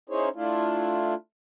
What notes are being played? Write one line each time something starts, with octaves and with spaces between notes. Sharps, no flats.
C#4 D#4 E4 G#4 C5 C#5
A3 D4 E4 F4